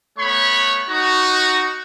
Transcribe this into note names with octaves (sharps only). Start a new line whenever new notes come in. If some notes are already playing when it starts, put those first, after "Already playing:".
A3 B3 C#5 B5 C#6
D#4 F#4